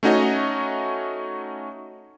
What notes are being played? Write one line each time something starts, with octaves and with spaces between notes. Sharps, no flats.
A3 C#4 D#4 F#4 C#5 D#5